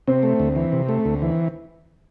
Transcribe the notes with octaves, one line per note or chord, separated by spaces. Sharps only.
C3 C4
A3
D2
E3
C3
A3
D2
E3